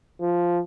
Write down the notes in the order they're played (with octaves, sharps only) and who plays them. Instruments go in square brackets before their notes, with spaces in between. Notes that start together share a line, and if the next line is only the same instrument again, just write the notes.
[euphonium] F3